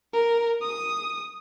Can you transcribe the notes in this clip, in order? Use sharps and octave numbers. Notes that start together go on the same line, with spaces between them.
A#4
D#6